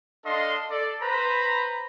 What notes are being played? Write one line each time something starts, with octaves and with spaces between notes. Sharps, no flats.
D4 A4 D#5 F5 C6
A4 D5
B4 C5 A#5 B5